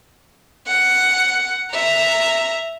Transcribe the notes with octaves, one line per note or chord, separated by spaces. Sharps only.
F#5
E5 A#5